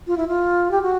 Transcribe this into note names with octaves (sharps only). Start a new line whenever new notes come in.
F4
E4
F4
G4
F#4